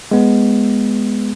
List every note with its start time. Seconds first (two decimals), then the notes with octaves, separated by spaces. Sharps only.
0.11 G#3 B3